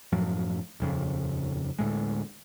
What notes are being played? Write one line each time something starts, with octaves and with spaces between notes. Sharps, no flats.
F#2 A2 F3 F#3
D#1 F2 C#3
D2 A2 G#3